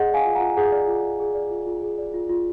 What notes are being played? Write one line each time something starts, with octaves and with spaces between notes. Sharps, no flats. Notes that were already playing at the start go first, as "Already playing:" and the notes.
Already playing: G#4 D#5 F#5
D5
F5 G#5
F4
F4 F#5 A#5
G#4 F#5 A#5
D5
F4
F4
G#4
D5
F4
F4
G#4
D5
F4
F4